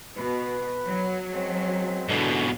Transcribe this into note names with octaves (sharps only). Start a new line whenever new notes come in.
B2 B4
F#3
F#2 G#3 C4
G#2 B2 D3